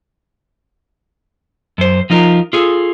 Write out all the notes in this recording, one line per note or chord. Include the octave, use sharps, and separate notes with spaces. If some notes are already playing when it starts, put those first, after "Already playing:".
F#2 C5
F3 D#4 F4 A#4
F4 G#4 A4